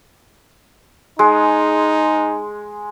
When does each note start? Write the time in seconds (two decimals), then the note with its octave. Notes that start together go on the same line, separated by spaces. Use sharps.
1.19 G#3 D#4